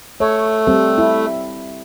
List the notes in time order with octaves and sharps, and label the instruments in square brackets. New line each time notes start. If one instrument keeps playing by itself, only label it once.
[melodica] A3 [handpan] C#5
[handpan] G3 C4 A4
E4